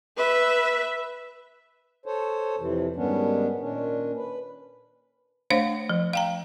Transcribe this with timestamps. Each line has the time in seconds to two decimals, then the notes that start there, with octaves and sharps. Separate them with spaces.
0.17 B4 E5
2.06 A4 C5 C#5
2.58 F2 C3 E3
2.96 G#2 D#3 G3 B3 C#4 D4
3.60 A#2 D#3 C#4 D4
4.16 B4
5.50 A3 D4 C5 C#5 F5
5.89 F3
6.13 F5 G5 A#5